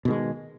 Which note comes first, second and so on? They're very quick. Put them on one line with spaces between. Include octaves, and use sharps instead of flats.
B2 D#3 G#3